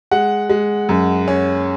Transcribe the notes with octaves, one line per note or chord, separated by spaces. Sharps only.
G#3 F#5
G#3
F#2
C#4